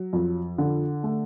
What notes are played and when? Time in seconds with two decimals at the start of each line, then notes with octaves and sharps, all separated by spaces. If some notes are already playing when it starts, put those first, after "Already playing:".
Already playing: F#3
0.13 F2
0.58 D3
1.04 A3